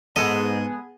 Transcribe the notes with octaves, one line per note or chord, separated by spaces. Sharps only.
G#2 G#3 B3 G#4 A4 D#5 A5